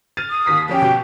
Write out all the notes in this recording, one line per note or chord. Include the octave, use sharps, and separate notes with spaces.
F6 A6 D#7
D#6
D#2 B6 C7
F2 C#4 G4
B2